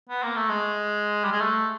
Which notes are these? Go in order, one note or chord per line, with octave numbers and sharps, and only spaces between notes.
B3
A#3
A3
G#3
G3
G#3
A3